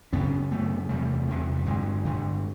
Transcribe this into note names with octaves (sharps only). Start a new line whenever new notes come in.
F#2 C#3 B3 C#4
F#2 C#3 A3 B3
E2 C3 G3 A3
E2 C3
G3
G2 D3 F#3 G#3
G2 D3